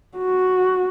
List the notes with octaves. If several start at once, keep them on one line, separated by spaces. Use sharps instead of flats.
F#4